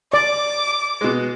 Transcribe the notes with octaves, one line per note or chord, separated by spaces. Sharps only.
D5 D6
B2 G#3